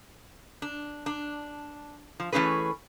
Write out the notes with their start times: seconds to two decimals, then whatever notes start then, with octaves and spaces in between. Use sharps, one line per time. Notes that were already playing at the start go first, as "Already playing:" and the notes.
0.62 D4
1.06 D4
2.20 F3
2.33 E3 A3 C#4 G#4 B4